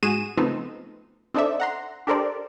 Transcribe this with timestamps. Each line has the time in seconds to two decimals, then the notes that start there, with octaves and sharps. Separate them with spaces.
0.03 G#2 G#3 F#4 G#4 D#7 E7
0.37 C#3 F3 A3 B3 C4 D#4
1.34 C4 D4 D#4 A4 D5 E5
1.60 F#5 A#5 C6
2.07 D4 G4 A4 A#4 C5 D5